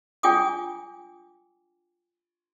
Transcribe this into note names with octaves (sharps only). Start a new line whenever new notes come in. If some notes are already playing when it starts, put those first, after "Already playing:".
D4 F4 G5 G#5 D6 D#6